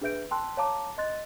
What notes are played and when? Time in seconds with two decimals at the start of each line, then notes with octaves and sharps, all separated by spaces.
0.01 D4 G#4 B4 E5 G6 D7
0.31 G5 A5 C6 E6 F#6
0.57 C#5 F5 A5 A#5 D6
0.98 D#5 C6 F#6 A6